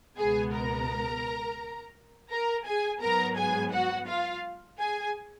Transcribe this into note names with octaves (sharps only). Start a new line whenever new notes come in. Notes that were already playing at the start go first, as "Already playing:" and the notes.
C#2 B2 G#3 B3 G#4 G#5
A#4 A#5
A#4 A#5
G#4 G#5
G#2 F#3 B3 A#4 A#5
G#4 G#5
F#4 F#5
F4 F5
G#4 G#5